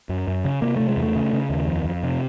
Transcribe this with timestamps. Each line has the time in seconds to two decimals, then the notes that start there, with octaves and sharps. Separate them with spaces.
0.09 F#2
0.27 F#2
0.45 C#3
0.62 C3 A#3
0.76 C3 A3
0.89 G#3
0.97 E2
1.03 A3
1.16 C#3
1.33 C#3
1.50 D#2
1.68 F2
1.85 F2
2.03 C3